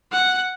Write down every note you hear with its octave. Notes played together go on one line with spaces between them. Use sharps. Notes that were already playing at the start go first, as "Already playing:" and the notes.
F#5